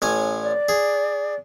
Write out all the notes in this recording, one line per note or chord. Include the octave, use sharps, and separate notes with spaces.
A1 C#4 G#5
D5
G#4